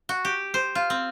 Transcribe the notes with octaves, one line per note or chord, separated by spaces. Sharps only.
F#4
G4
C5
F4
C4